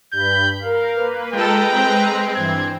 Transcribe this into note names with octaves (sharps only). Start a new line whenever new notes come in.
G2 B5 G6
A#4 F5
A#3 B4
G#3 F4 A4 B4 G5 A#5
C4
G2 E3 G#6